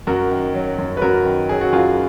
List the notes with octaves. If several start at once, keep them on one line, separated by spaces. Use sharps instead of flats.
F#2 F#4 A#4
D#3
F#3
F#2
B4
F#2 F#4 A#4
D#3
F#3 G#4
F#4
F#2 F4 G#4